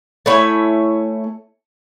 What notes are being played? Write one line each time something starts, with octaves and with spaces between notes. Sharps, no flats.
A3 E4 C#5 G#5